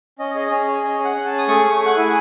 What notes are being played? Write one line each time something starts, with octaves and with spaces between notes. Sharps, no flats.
C#4 D#5
G#4 D#5
D#5
C#4 C#5
G#4 C#5
C#4 D#5
G#4
F#5
C#4
A5
G#4
D#6
A3 C#6
A3
G#4
F#5
E4 G#5